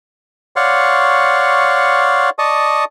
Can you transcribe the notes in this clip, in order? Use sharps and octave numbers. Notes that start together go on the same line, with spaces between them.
C#5 D5 F5 F#5 C6 C#6
D5 D#5 A5 C#6 D#6